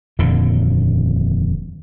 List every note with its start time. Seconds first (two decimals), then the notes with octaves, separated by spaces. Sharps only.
0.19 D#1 F2 A#2 D3